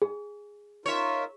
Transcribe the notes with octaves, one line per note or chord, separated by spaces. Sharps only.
G#4
D#4 F4 A#4 C#5 E5